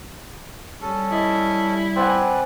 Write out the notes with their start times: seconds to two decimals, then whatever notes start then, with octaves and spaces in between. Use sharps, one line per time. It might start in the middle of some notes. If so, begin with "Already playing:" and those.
0.81 G3 C#4 A4
1.11 E4 D#5
1.96 C4 B4 D5 F#5 G#5